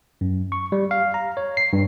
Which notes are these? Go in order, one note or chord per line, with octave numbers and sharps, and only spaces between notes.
F#2
C#6
G3
F5
A#5
C#5
C7
G2